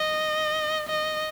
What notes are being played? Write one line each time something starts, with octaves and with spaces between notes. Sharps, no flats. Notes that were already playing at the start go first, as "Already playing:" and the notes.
Already playing: D#5
D#5